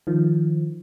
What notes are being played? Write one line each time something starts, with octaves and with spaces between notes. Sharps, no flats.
D#3 F3